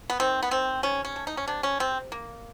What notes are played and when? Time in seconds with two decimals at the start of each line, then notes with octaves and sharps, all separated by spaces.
0.10 B3
0.20 D#3 C4
0.43 B3
0.51 D#3 C4
0.83 C3 C#4
1.05 C#4
1.16 A3
1.27 D#4
1.37 C#4
1.48 C3 D4
1.63 C#4
1.80 C3 C4
2.12 A#3